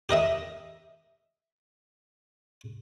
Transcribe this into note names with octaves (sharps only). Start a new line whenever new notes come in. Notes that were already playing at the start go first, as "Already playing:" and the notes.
G4 A#4 D#5 E5